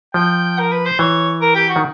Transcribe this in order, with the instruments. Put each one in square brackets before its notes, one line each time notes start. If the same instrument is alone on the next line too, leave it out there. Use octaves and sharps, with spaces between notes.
[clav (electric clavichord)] F3 [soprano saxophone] G5
[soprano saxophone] A#4
B4
C5
[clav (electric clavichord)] E3 [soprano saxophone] C#5
[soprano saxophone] A#4
G4
F#4
[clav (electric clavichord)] D#3